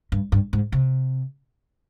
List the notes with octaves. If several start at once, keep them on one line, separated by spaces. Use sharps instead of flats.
G2
G2
G#2
C3